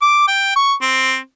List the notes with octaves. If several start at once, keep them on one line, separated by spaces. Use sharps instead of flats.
D6
G5
C#6
C4